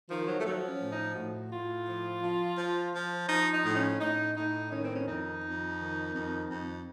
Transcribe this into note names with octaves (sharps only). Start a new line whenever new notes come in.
D#3 F3
F#3
A3
F3 F#3
C#4
A2
D#4
A2 F#4
A2 F4
F3
F3
F3
F3
F3 D#4
D#4
A2
C#4
A2 D#4
A2 D#4
D#3 C#4
C4
C#4
F2 D#4
F2
D#3
F2
F2